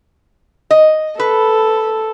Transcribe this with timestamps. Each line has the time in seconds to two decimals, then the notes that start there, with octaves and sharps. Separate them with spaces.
0.71 D#5
1.19 A4 B4